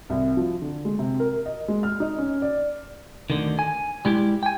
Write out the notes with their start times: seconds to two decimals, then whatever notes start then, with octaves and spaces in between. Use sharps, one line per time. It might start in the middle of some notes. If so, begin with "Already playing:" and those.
0.10 C2
0.37 F3
0.62 D3
0.85 G#3
0.99 C3
1.20 A#4
1.46 D#5
1.68 G#3
1.83 F6
2.00 D#4
2.18 C#4
2.42 D5
3.30 D2 G2 D3 D#3
3.59 G#5
4.05 G3 G#3 E4 G4
4.43 G5 G#5